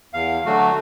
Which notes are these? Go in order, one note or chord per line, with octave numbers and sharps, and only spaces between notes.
E2 F5
D3 F#3 A3 F#4